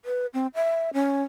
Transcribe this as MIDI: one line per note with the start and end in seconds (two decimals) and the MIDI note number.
0.05 0.26 71
0.34 0.47 60
0.55 0.90 76
0.94 1.23 61